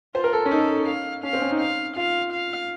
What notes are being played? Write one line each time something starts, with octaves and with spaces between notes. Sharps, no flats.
F4 C5
A#4
A4
C#4
D#4 A4
F5
C#4 F5
C4
C#4
D#4
F5
F4 F5
F5